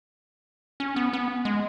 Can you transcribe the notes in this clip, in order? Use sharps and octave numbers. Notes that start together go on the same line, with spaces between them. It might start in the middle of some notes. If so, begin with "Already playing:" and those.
C#4
B3
B3
G#3